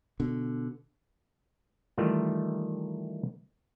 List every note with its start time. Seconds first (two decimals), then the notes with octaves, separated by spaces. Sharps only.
0.20 B2 D3
1.98 D#3 E3 G3 A3 D#4 F4